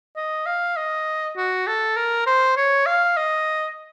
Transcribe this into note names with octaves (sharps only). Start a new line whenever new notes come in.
D#5
F5
D#5
F#4
A4
A#4
C5
C#5
F5
D#5